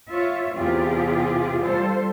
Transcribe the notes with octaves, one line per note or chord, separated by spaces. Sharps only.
F4 C#5 E5
E2 C3 F4 G4 G#4
G3 F4 A4 C5